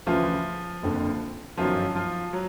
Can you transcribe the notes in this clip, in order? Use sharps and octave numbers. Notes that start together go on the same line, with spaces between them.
D2 C#3 E3 F3 F4
F#1 F2 D3
G1 F#2 D#3 F3 F#3 F4
F3 F4
F#3